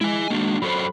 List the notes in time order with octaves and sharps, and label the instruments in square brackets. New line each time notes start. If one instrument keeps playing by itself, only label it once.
[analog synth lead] G#3 [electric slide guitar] E4 G#5
[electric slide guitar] A#3 D4 F#4
[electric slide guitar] F#3 A4 C5 [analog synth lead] B5